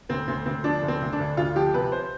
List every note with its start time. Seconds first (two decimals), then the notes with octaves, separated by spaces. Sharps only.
0.09 D2 C4
0.27 D2 C4
0.46 D2 C4
0.64 F3 D4
0.82 D2
0.88 C4
1.01 D2
1.13 D4
1.20 D2
1.37 D2 F4
1.56 F3 G4
1.74 C3 B4
1.92 C5